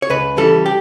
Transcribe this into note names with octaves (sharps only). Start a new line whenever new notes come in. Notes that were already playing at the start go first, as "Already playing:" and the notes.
C#5
C#2 B4
C#3 E3 G3 A4
G4